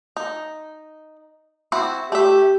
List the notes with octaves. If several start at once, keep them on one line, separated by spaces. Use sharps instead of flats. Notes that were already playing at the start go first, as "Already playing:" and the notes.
D#4
C4 E4 F#4
A3 G4 E5